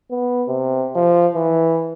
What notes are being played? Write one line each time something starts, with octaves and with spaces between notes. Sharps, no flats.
B3
C3
F3
E3